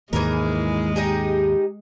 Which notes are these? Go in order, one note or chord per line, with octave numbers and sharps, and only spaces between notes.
D#2 G#2 E3 G#3 G#4 A#4
D#4 G4 G#4